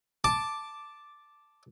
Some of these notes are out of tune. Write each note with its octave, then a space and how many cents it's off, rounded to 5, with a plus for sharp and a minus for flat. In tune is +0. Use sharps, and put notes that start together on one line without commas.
A5 +0 D6 +0